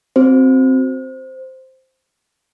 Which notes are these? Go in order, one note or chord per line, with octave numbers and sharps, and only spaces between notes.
C4 F#4 C5